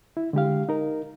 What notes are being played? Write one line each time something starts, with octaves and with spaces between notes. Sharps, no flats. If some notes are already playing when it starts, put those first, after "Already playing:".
E4
D3 G#3 G4 F5
D#4 A#4